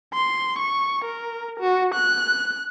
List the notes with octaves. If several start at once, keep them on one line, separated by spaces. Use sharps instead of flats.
C6
C#6
A#4
F#4
F#6